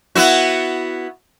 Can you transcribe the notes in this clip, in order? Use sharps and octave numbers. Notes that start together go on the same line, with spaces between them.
B3 E4 F#4